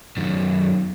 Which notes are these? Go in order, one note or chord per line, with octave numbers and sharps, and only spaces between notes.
F#2 D#3